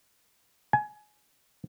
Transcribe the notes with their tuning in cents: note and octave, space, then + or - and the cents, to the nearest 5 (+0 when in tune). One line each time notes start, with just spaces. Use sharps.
G#5 +20